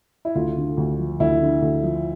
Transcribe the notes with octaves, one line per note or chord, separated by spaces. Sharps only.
E4
D2 F4
D3
D2
F3
D2 E4
D3
D2
F3